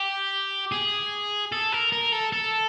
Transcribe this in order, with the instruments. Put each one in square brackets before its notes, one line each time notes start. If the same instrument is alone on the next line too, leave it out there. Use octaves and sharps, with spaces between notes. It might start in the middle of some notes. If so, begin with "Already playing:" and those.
Already playing: [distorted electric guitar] G4
G#4
A4
A#4
A#4
A4
A4